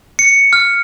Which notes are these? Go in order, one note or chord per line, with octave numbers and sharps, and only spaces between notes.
C#7
F6